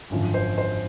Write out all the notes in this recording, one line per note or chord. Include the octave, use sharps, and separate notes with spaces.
G#1 F#2 D3 F3
C5
C5